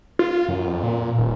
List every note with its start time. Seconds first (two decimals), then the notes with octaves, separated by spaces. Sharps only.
0.19 F4
0.49 F#2
0.67 F2
0.83 A#2
1.18 D#1